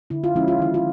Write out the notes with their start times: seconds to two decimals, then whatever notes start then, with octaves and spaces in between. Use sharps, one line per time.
0.10 D3 E4
0.24 F4
0.35 F3 G#3 C#4 E4
0.48 F4
0.59 D#3 E4
0.74 F4